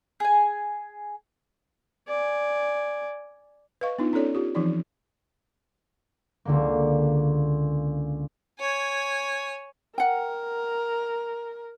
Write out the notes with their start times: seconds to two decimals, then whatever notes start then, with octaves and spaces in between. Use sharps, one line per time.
0.20 G#4 G#5
2.08 D5 G#5
3.81 B4 D#5 F5 C#6
3.98 B3 D4 D#4 F4
4.13 C#4 D#4 F4 A4 C#5 D5
4.35 F4 G4
4.55 E3 F3 C4 D#4 D5
6.45 C#2 D3 A#3
8.60 C#5 G#5
9.98 A#4 F#5 G5